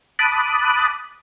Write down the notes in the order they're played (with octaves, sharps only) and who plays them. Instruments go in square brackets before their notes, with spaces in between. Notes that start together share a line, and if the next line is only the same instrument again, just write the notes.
[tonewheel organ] A5 B5 D6 D#6 F#6